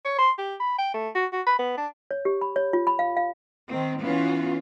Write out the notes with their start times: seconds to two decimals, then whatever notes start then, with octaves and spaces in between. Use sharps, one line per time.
0.05 C#5
0.18 C6
0.38 G4
0.60 B5
0.79 G5
0.94 A3
1.15 F#4
1.33 F#4
1.46 B5
1.59 B3
1.77 D4
2.11 C#5
2.25 G4
2.41 B5
2.56 C#5
2.73 F4
2.87 B5
2.99 F5
3.17 F5
3.69 D#3 C4
4.03 E3 B3 C#4 F4